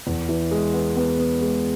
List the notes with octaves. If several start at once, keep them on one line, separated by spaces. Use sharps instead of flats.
E2
E3
G#3
B3
B3
B3
G#3